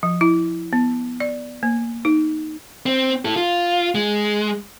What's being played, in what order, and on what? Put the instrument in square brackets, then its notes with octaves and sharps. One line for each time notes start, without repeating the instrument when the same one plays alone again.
[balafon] F3
E4
B3
D5
A#3
D#4
[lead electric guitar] C4
E4 A4
F4
G#3